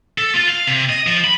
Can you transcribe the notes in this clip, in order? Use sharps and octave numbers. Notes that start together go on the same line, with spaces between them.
A4
F4
F5
C3
D#5
F3
B5